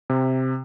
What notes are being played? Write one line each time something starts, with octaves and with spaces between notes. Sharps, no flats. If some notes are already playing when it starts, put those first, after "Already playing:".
C3